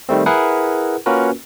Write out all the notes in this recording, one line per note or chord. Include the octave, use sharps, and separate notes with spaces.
D#3 G3 A3 C4
E4 G#4 A#4 B4 F#5
A#3 C#4 F4 F#4 A#4 B4